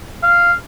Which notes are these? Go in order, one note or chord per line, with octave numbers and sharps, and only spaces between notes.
F5